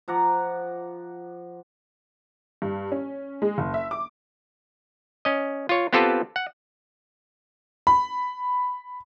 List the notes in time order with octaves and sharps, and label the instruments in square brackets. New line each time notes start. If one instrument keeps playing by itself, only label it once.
[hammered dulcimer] F3 F#5 A#5 D6
[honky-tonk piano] G2
C#4
G#3
F#1
E5
D6
[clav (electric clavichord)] C#4 D#5
F4 C#5
B3 C4 F4 G4 A4 B4
F#5
[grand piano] B5